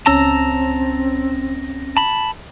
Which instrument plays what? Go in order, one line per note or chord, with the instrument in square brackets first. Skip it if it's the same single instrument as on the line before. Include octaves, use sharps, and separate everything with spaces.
[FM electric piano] C#2 C#4 A#6 [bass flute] C4 [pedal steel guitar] A5 A#5 E6
[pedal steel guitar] A5 B5